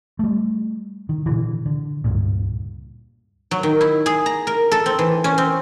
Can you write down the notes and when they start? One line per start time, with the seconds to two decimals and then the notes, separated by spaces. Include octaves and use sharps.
0.19 G3 A3
1.09 D#3
1.26 A#2 D3 E3
1.66 D3
2.04 C#2 G2 A#2
3.51 F#3
3.63 D#3
3.81 E4
4.06 G#4
4.26 A#5
4.47 A#4
4.72 A4
4.86 C4
4.99 E3
5.24 C#4
5.38 C4